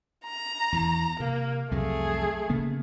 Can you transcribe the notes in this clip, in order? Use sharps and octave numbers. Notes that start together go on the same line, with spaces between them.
A#5
E2 E3
C3 A#3
C2 F2 F#3 A3 G#4
C#3 A#3 B3